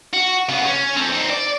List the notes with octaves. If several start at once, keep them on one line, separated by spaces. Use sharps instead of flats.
F#4
C#3 B3
C#4
C4 A4
C4 D#4
D5